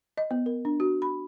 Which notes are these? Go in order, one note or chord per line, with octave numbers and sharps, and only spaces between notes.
D#5
B3
A#4
D4
F#4
B5